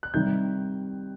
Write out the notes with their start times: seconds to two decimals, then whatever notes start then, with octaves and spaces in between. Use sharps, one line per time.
0.03 F#6
0.14 C3 D#3 G3 G6